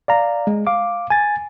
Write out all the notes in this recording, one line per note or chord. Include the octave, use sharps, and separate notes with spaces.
D5 F5 A#5
G#3
F5 D6
G#5 A6